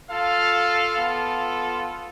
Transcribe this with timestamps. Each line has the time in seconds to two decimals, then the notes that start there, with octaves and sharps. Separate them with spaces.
0.11 F4 A4 F5
0.98 B3 F4 A4